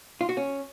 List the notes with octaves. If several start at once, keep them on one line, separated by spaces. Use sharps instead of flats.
F4
F#4
C#4